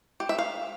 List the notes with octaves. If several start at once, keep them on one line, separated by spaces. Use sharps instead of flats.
G4
E5
F5